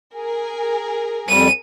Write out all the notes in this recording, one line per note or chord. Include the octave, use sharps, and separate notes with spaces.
G#4 A#4 G#5
F2 G3 D#7